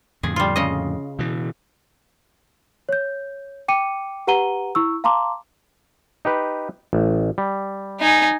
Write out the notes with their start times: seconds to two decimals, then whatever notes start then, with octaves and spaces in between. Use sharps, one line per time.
0.23 F2 A2 D3 G#4
0.36 G3 F4
0.56 C#3 D#5
1.19 B2 E3
2.89 C#5 G6
3.68 G5 D6 C#7 D#7
4.27 G4 B4 F#5 A#5 D#7 G7
4.75 E4 C#6 E6
5.04 F5 A5 A#5 C6 D6
6.25 D#4 G4 B4
6.93 A1
7.38 G3
8.00 D#4 G#5